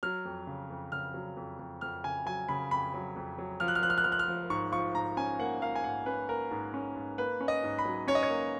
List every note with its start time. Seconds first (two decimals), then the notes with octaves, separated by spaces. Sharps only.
0.03 F#3 F6
0.25 F2
0.47 C#3
0.70 F2
0.92 C#3 F6
1.14 F#3
1.37 F2
1.59 F2
1.81 F2 F6
2.04 C#3 G#5
2.26 F#3 G#5
2.49 C#3 B5
2.71 F2 B5
2.94 F#3
3.16 F2
3.38 F#3
3.60 F3 F6
3.68 F#6
3.75 F6
3.82 F3 F#6
3.90 F6
3.98 F#6
4.04 F3 F6
4.12 F#6
4.19 F6
4.28 F3
4.50 G#2 C#6
4.72 F3 C#6
4.94 G#2 A#5
5.17 C#4 G#5
5.39 A#3 F#5
5.62 A#3 F5
5.75 G#5
5.84 G#2 F#5
6.06 C#4 B4
6.29 A#3 A#4
6.51 G#2
6.74 C#4
6.96 G#2
7.18 A#3 B4
7.41 C#4
7.48 D#5
7.64 G#2
7.79 B5
7.85 F#3
8.08 C#4 C#5
8.15 D#5
8.23 C#5
8.30 A#3